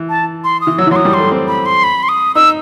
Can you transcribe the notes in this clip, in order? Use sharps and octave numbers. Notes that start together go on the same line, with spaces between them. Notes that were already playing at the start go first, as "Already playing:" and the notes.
Already playing: E3
A5
C6
D#6
E3
F#3 E6
E3
F#3 C6
D#6
G3
A3 C6
C4
B5
C6
B5
C6
D#6
D#4 E6